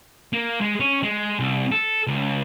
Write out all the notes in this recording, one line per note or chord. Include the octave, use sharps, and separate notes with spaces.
A#3
G#3
C#4
G#3
C2
A4
C#2